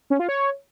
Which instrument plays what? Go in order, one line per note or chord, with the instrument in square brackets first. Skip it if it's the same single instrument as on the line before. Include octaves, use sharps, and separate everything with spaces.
[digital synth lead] C#4
F4
C#5